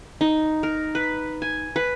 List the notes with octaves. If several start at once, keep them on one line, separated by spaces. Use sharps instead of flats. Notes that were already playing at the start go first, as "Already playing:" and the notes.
D#4
A#4
B4
G#5
B4